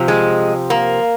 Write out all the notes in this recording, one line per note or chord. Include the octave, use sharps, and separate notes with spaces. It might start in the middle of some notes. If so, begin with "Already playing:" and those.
Already playing: C3 F3
G#3
A#3